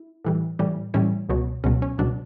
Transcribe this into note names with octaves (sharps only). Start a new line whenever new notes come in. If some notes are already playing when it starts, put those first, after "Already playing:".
Already playing: E4
A2 E3 G3
A2 E3 G3
A2 E3 G3 C#4 E4
C#2 B2 F#3
C#2 B2 F#3 C#4
C#4
C#2 B2 F#3 D4